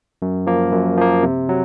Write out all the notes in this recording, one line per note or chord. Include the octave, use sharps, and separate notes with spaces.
F#2
F3 A#3
F#2
F3 A#3
C3
F#3